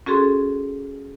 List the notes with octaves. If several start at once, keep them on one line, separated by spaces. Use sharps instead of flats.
C#4 F#4 G#4 A4 C6